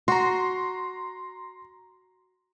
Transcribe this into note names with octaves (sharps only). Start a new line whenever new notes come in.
F#4 A#5 C6